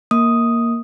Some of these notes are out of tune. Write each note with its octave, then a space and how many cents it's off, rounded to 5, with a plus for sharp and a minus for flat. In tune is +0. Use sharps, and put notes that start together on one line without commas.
A#3 +0 D#6 +0